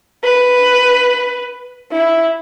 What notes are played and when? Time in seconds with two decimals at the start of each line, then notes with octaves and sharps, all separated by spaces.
0.24 B4
1.92 E4